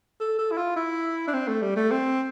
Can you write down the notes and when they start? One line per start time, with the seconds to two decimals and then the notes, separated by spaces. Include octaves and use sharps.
0.20 A4
0.39 A4
0.51 E4
0.57 F4
0.76 E4
1.27 D4
1.33 C4
1.48 A3
1.62 G3
1.76 A3
1.91 C4